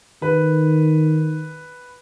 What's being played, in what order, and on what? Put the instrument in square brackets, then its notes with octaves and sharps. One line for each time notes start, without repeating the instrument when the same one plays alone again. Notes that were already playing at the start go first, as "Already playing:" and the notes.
[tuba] D#3 [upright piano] B4